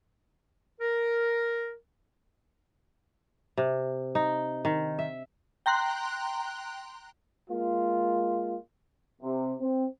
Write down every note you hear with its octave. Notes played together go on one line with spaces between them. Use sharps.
A#4
C3
D#4
D#3
E5
G5 A#5 C6 F#6
G#3 A#3 F4
C3
C4